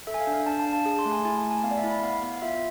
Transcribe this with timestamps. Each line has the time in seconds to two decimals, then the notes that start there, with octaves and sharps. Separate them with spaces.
0.07 A4 E5
0.14 G#5
0.20 F5
0.27 D4
0.34 F5
0.46 D4 A5
0.60 A5
0.66 D4
0.73 A5
0.86 G#4
0.99 C6
1.05 A3
1.12 G#5
1.25 E4 G#5
1.37 A5
1.45 A3
1.51 G#5
1.64 B3 F5
1.71 D5
1.78 E5
1.84 E4
1.90 B5
2.02 B3 F5
2.23 B3
2.42 F4 E5